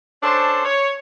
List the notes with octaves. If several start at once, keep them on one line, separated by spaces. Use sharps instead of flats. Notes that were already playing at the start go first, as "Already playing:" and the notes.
C#4 D4 A4 C5
C#5